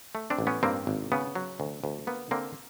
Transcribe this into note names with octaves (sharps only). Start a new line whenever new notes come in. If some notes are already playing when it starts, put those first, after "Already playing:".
A3
C4 D4
A1
B3 C#4
G2 A#3 C4
G#1
C#3 B3
F#3
D2
D2
A#3 B3
D3 A#3 C4